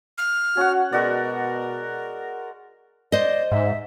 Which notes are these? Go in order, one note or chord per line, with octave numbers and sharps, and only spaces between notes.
F6
C#4 F#4 F#5
B2 G#3 F#4 A#4 D5
C5 D5 D#5
G#2 E5